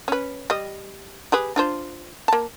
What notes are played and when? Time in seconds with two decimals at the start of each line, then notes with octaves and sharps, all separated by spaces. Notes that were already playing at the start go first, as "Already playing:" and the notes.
0.08 C#4 B4
0.50 G3 D#5
1.32 G4 G#4 B4
1.56 D4 F4 C5
2.28 A#3 A5